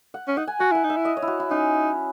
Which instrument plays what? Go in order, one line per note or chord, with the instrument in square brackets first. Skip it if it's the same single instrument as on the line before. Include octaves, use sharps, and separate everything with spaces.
[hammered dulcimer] F#5
[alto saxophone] C#4
[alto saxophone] D#4 [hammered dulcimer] F#5
[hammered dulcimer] G#5
[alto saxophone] F#4 [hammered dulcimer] F#5
[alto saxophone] E4 [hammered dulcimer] F#5
[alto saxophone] D#4
[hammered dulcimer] E5
[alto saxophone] E4
[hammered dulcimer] D#5
C#5
E4
F#4
E4
[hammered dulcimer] C#4 [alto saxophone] D#4